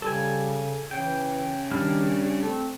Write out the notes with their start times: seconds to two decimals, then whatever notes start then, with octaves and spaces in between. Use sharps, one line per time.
0.02 C#3 G3 A4 G#5
0.91 C#3 E3 G5
1.71 D#3 G3 D4 F6
2.42 A3 C4